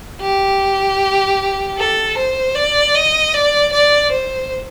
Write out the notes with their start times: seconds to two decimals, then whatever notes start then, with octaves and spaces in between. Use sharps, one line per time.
0.21 G4
1.77 A4
2.17 C5
2.55 D5
2.95 D#5
3.34 D5
3.73 D5
4.11 C5